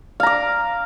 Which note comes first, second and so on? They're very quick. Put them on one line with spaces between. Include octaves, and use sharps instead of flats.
F5 A#5 D6